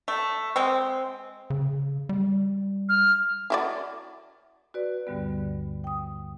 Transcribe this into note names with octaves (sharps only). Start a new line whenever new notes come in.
A3
G#3 C4
C#3
G3
F6
E4 F#4 D5
F#4 B4 D5
D2 G2 D3 G3 B3
G5 D#6